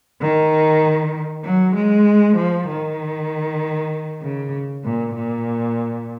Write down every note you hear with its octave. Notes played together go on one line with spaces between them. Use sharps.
D#3
F#3
G#3
F3
D#3
C#3
A#2
A#2